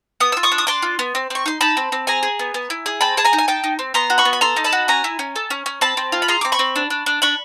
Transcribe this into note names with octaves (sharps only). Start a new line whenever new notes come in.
B3 D#6
F4 E6
C#6 D#6
D4
D#6
D4 C6 D6
F4
B3
C4
C4 C#6
D#4 C6
D#4 A5 B5
C4
C4
G#4 G#5 A#5
G#4
B3
B3
E4
G#4
C4 A5 B5
G#4 A5
G#5 A#5
D#4
G#5
D#4 G5 A5
D#4
C4
B3 A#5 C6
F#4
B5 C#6
B3
B5
A4 A#5 C6
D#4
A5 B5
F#4
C#4 G#5 A#5
E4
C#4
A4
C#4
C#4
C4 A5 B5
C4
F4
B5
G#4 A#5 C6
C4 D6
B5 C#6
C4
D4
D4
D4
D4 B5 C#6